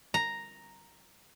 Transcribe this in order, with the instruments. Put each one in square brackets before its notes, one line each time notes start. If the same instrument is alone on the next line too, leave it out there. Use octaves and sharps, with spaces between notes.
[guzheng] A#5